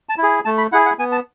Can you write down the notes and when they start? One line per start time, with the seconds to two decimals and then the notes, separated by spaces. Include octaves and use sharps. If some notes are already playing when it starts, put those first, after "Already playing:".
0.09 A5
0.18 E4
0.23 G#4
0.45 A3 A5
0.58 B5
0.72 E4 G#4 F#5
0.85 F#5
0.98 B3 G#5
1.12 A5